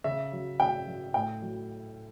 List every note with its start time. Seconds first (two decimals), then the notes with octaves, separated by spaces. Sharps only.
0.04 C#3 E5
0.32 F#3
0.60 C#3 G5
0.87 F#3
1.14 A2 G5
1.42 F#3